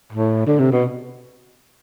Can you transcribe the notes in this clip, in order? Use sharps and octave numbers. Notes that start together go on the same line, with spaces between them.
A2
D3
C3
B2